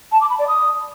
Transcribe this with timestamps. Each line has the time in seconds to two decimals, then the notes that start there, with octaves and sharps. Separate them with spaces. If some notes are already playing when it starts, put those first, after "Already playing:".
0.12 A5
0.21 D6
0.30 B5
0.39 D5
0.48 D#6